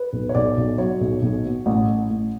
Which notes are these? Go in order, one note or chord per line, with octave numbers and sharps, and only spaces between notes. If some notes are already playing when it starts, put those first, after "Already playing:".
Already playing: B4
B1
C#5
B1 D5
B1
F#3 C#5
B1
B1
B2
A1
A1
A1